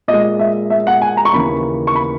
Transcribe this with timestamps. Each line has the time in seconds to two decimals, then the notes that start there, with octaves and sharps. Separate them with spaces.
0.08 A#2 D#5
0.13 G#3
0.39 E5
0.70 E5
0.87 F#5
1.02 G#5
1.17 A#5
1.25 C#6
1.33 D#2 C#3 E3 B5
1.87 C#6
1.95 B5